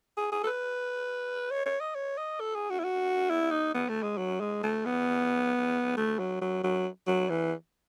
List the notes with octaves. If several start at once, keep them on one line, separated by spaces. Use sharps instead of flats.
G#4
G#4
A4
B4
C#5
C#5
D#5
C#5
D#5
A4
G#4
F#4
E4
F#4
E4
D#4
B3
A3
G#3
F#3
G#3
A3
B3
A3
F#3
F#3
F#3
F#3
E3